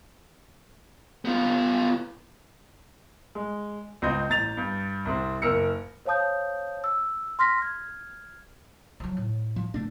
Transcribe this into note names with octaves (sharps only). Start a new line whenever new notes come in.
B3 F4
G#3
C#2 C4 D#5 G6
A1 A#5 A6 F7
G2
C2 C4
F#1 A#4 E6 C#7
C5 C#5 F5 A5 D#6 G6
E6
C6 F6 A#6 B6
F6 G#6
F3 F#3
A2
F3
B2 A3 D4